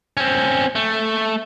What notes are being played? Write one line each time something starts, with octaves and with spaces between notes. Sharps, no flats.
C4 C#4
A3